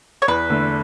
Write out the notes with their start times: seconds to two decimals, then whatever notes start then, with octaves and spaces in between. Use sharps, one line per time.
0.22 C#5
0.28 E2 B4
0.50 D3 A3